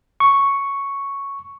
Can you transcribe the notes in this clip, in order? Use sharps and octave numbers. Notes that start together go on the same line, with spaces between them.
C#6